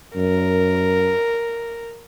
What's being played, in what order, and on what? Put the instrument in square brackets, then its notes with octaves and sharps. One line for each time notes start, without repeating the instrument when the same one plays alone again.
[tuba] F#2 [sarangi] A#4